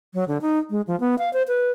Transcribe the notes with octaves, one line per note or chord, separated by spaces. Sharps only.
F#3
D3
D#4
G#3
F3
B3
F5
C5
B4